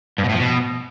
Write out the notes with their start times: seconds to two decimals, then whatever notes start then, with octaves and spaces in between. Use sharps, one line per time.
0.18 G2
0.24 B2
0.29 A2
0.34 F3
0.40 B2